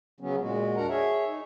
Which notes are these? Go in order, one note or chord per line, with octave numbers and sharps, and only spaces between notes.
C#3 F#3 B3 C#4
A#2 G#3 F#4
E2 D4 A#4 F#5 A#5
G#4 C#5 E5
D#4